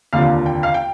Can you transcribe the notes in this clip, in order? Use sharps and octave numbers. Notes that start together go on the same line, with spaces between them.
F1 D#2 D3 F3 F5
G5
F5
G5